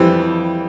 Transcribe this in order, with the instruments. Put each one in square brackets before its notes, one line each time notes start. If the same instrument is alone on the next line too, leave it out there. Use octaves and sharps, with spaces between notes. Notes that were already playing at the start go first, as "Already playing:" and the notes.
Already playing: [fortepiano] F2 E3 G3 C4